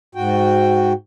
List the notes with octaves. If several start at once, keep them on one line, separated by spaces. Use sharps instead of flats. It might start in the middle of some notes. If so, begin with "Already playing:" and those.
G#2 F#4 G5